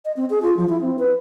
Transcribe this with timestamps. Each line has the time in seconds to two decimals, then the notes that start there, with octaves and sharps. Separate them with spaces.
0.05 D#5
0.17 C4
0.30 G#4
0.42 F4
0.57 F3
0.69 E4
0.81 C4
0.99 B4